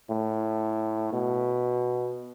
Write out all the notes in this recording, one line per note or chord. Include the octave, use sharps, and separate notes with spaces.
A2
B2